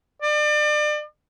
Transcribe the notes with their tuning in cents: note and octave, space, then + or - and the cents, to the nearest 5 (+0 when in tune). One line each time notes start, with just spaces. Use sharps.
D5 +35